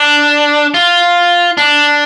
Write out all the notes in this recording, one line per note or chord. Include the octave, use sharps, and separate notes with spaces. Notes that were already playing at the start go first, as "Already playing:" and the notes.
Already playing: D4
F4
D4